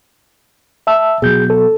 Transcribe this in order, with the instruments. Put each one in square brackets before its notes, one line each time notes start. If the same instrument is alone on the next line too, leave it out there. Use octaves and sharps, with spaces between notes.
[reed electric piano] E5 A5 E6
[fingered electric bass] B2 F#3 [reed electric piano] G#4 G6
[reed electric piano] A4